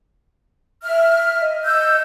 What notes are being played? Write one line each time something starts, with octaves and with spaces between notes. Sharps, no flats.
E5 F6
D#5
E6 G6